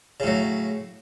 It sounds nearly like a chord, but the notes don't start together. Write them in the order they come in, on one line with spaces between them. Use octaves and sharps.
C#3 A2 F#3